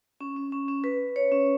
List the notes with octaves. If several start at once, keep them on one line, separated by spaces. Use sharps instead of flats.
C#4
C#4
C#4
C#4
B4
C#5
C#4